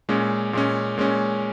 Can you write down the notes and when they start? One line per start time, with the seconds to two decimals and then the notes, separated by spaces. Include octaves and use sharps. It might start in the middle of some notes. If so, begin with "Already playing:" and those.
0.09 A#2 G#3 C#4
0.53 A#2 G#3 C#4
0.98 A#2 G#3 C#4